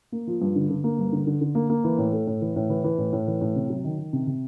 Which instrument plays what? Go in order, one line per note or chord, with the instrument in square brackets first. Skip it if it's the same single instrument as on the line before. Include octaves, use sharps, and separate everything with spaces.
[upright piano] A#3
F3
G2
D3
D3
A#3
G2
D3
D3
D3
A#3
A#3
E3
A2
A3
A2
E3
A2
E3
E3
A2
A2
E3
A2
C3
F#3
D#3
D#3
C3
C3